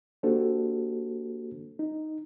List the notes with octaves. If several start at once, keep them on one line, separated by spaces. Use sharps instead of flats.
A#3 D4 F#4 G4 A4 C5
D#4